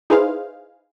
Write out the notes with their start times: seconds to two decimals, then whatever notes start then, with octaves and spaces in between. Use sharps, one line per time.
0.10 D#4 E4 G#4 B4 C5 F5